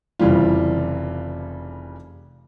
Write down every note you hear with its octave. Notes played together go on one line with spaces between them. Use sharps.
F1 C#3 E3 G3 F4